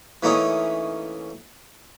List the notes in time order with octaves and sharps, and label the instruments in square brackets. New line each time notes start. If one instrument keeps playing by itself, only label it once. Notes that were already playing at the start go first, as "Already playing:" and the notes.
[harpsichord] E3 A3 A#3 C#4 D#4